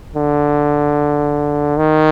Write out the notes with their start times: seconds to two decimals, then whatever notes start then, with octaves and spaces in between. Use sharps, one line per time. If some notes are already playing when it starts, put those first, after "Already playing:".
0.16 D3
1.77 D#3